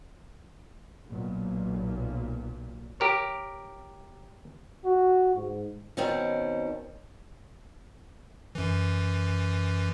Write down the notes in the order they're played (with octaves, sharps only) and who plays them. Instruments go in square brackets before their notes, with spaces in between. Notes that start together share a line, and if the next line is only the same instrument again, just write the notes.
[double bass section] B1 A#2
[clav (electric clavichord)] G4 A#4 C#5
[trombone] F#4
G#2
[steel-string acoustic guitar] B2 D#3 C4 C#4
[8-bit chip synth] F#2 E3